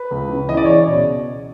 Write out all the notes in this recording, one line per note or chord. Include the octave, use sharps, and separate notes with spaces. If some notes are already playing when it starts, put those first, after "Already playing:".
Already playing: B4
C#2
C#3
E3 D#5
D5
C#5
C#3 D5
B2